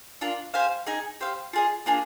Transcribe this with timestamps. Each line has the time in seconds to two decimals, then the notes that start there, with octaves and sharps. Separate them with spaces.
0.21 D4 F4 A#4
0.54 G4 C5 F5 G#5
0.87 D#4 G#4 D#5 G#5
1.21 G4 C5 F5
1.53 F4 G#4 D#5
1.86 A#3 D4 F4 G#4